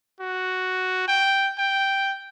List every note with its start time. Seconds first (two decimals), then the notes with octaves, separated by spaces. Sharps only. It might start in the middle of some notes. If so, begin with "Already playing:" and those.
0.20 F#4
1.08 G5
1.58 G5